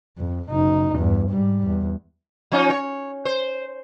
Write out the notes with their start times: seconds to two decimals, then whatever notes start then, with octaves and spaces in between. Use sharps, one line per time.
0.18 F2
0.50 F#1 D#4
0.95 E2 G2
1.30 G#2 G3
1.66 E2
2.52 F3 C#4 D#4
2.70 C#5
3.25 C5